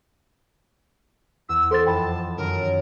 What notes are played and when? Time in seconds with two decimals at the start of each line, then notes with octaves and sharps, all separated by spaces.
1.49 E2 E6
1.71 E4 A4 C5 D#5 C6 A6
1.86 F2 G5 A5 B5
2.37 F#2 D#3 F#3 A#4